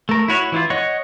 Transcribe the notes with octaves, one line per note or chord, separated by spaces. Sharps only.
A3 A#4
E4 F#4 C#5
E3 E4 F4
C#5 D#5 F#5 C#6